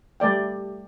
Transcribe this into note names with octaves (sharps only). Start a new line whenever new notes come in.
G3 A3 D5 G5